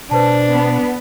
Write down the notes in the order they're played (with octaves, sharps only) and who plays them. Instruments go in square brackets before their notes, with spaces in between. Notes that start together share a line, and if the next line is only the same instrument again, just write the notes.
[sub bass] B2 [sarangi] D4 [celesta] B4 C5 A5
[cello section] B3